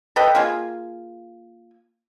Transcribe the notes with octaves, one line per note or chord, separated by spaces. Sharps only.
A4 B4 D#5 G5
A#3 F4 G#4